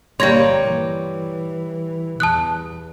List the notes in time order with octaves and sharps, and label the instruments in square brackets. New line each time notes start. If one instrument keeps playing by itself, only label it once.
[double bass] G1 A#3 [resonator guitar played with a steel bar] G3 C#5 [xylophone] C6 G#6 A#6
[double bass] E3
[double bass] E2 [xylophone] A5 D#6 F#6